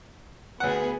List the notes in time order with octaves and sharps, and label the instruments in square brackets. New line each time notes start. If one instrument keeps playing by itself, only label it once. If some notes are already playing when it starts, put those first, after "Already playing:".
[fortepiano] D2 F#5 [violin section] B3 G#4 B4